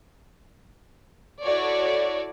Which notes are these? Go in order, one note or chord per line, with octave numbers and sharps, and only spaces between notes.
E4 F#4 A4 C#5 D5